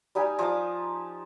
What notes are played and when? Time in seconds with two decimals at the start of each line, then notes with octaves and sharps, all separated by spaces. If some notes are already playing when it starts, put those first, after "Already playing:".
0.15 G3 D#4 G4 G#5
0.39 F3 D#4 D6